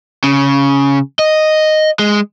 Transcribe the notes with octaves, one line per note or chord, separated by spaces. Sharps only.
C#3
D#5
G#3